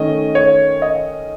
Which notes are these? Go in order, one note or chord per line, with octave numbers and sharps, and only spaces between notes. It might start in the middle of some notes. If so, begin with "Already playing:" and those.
Already playing: D#3 A3 C#4 D#5
C#5
D#5